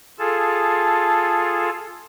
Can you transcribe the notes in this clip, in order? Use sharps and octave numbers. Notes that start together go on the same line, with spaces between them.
F4 G#4 A4 A5